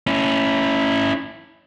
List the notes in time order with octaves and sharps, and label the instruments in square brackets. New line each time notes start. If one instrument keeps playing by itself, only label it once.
[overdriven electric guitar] C#4 E4